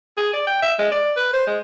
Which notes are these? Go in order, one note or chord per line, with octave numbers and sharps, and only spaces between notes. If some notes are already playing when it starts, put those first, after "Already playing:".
G#4
D5
G5
E5
G#3
D5
B4
C5
G#3